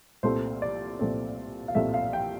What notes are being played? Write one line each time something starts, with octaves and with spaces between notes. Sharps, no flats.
C2 A#2 A3 C4 C5
D5
C2 A#2 A3 C4
F5
C2 A#2 A3 C4 E5
F5
G5